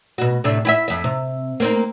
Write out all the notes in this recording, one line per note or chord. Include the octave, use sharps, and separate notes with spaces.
B2 F#4
A2 C3 D4
E4 G4 E5
F2 E5
C3
A#3 C4 D#4